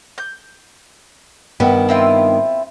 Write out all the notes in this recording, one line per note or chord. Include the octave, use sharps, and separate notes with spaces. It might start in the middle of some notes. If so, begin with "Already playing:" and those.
G6
G2 D#3 B3
C4 E4 F4